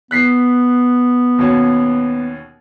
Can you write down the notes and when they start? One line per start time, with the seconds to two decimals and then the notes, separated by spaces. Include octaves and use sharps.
0.11 B3 F#6 B6 C7
1.39 D#2 B2 C#4